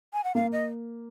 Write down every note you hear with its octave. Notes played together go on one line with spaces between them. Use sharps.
G#5
F#5
A#3 F5
D#5